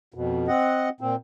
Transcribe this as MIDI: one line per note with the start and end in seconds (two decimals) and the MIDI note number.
0.14 0.48 41
0.14 0.48 47
0.48 0.89 60
0.48 0.89 75
0.48 0.89 78
1.01 1.15 46
1.01 1.15 60